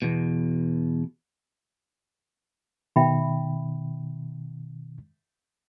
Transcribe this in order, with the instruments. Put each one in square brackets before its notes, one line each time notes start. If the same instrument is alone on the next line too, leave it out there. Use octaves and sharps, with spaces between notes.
[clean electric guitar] E2 B2
[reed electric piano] B2 D#3 [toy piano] E5 G5 B5